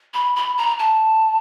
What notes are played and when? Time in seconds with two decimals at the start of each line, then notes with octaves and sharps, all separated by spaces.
0.14 B5
0.36 B5
0.58 A#5
0.79 A5